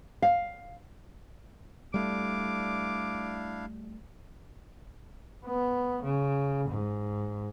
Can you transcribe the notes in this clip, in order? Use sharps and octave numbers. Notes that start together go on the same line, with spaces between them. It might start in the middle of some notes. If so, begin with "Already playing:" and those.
F5
G3 A3 D4 E4 F5 D6
B3
C#3
G#2